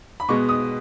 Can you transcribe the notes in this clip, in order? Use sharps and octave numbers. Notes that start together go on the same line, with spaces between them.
B5
B2 G#3 B3 C#6
D#6